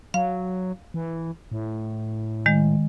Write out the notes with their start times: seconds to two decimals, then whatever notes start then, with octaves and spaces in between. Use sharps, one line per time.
0.14 F#3 F5
0.94 E3
1.52 A2
2.46 D#3 G#3